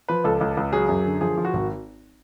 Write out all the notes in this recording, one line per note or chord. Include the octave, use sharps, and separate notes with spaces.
F3 B4
C#2 A4
C#2
C#2
F#3 G#4
F#2
D3
F3 G#4
F3
F#4
G#1